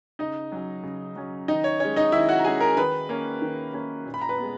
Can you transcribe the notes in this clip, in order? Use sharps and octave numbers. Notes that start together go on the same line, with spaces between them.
C#3 D#4 D#5
F#3 C#4
C#3
F#3 C#4
D#3 D#4 D#5
C#5
G#3 C#4 C#5
D#4 D#5
D#3 E4 E5
F#4 F#5
A#5
G#3 C#4 G#4 G#5
A#4 A#5
D#3 B4 B5
A#3 C#4
D#3
A#3 C#4
A#2
B5
A#5
B4 B5
G#3 B3